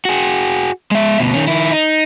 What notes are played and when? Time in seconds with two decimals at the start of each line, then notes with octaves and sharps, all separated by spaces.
0.05 F#4 G#4
0.91 G#3 E5
1.20 D2 B2
1.33 D#3 C#4
1.48 D#3 E4
1.71 D#4